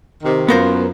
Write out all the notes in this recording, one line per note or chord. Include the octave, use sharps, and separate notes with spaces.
C3 D#3
F#2 B3 F4 A#4 C5